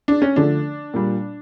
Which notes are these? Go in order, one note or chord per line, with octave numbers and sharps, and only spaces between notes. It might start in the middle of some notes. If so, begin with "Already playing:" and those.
D4
C#4
D3 F3 A3 D4
A#2 G3